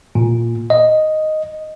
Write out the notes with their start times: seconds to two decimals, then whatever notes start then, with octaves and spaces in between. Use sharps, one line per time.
0.15 A#2
0.70 D#5